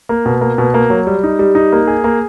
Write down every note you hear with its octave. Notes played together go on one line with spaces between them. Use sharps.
A#3
B2
A#3
B2
A#3
F#3
G3
D#4
G3
D#4
A#3
G#4
A#3